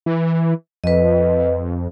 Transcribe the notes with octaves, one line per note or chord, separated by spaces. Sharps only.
E3
F2 B4 D#5